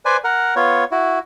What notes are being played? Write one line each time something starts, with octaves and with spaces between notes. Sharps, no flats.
B4 C5 D5 G#5
A#4 F#5
B3 F4 C#5
E4 F#4